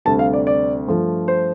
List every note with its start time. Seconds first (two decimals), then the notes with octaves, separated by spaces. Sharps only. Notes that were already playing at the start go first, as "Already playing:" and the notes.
0.05 D2 C3 G3 A5
0.19 F5
0.33 D5
0.47 D5
0.88 G2 F3 A3
1.28 C5